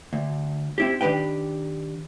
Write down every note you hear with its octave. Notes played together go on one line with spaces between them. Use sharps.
D2
C4 E4 G4
D#3 D4 G4 B4 G5